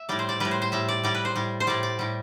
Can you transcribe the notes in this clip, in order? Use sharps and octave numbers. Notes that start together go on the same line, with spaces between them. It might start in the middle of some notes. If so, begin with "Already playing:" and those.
Already playing: E5
A2 G3 D5
C5
D5
A2 G3 B4
C5
C5
A2 G3 E5
D5
A2 G3 D5
B4
C5
A2 G3
C5
A2 G3 D5
D5
A2 G3